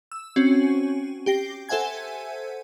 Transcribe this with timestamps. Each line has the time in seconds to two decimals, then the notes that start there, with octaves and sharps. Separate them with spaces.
0.12 E6
0.36 C4 C#4 F#4
1.26 G4 G5 A#6 C7
1.69 A4 C5 E5 F#5 G#5 G#6